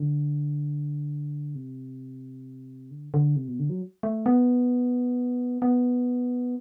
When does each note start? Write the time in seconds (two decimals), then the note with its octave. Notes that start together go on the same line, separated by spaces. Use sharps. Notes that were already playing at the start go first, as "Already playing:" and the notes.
Already playing: D3
1.55 C3
2.91 D3
3.14 D3
3.36 C3
3.48 B2
3.59 D3
3.70 F#3
4.03 A3
4.26 B3
5.62 B3